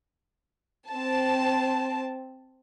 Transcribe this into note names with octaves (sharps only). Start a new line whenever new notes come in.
C4 A5